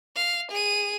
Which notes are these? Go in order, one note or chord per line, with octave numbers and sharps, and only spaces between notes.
F5
G#4 D#7